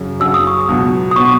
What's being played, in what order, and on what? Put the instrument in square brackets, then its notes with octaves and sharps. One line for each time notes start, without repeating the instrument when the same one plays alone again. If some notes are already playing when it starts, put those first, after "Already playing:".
Already playing: [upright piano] F#2 C#3 F#3
[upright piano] F#2 C#3 F#3 [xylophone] E6
[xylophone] D#6
C#6
D#6
[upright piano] C#2 B2 F#3 B3
[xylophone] D#6
[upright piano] B2 F#3 B3 [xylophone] C#6